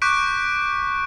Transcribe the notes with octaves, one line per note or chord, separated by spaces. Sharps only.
C#6 D6 F#6 G6 B6 D7